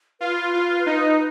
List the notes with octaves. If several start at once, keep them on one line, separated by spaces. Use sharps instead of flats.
F4 B4
F4
D#4